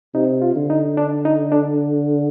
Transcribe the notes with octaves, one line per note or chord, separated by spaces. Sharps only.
C3 D#4
F4
D3
D#4
D4
D#4
D4